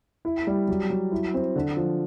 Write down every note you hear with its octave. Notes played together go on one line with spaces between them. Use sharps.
E4
G3
F#3
F#3
E4
C4
D3
F3